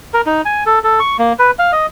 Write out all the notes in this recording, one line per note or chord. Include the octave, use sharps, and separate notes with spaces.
A#4
D#4
G#5
A4
A4
C#6
A#3
B4
F5
D#5